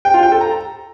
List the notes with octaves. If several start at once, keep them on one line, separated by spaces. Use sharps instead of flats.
G5
F4
G5
A4
A#5